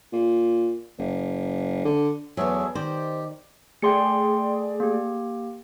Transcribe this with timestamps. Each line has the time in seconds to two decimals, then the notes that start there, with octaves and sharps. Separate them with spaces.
0.12 A#2
0.98 F#1
1.85 D3
2.37 E2 F#3 A3 B3 G#4 A#4 E5
2.75 D#3 G4 C5 D5 D#5
3.82 A3 G#4 D5 G5 C6 C#7
4.80 A#3 G4